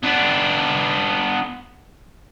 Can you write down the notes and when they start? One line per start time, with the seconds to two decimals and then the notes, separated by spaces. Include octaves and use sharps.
0.03 B3 D4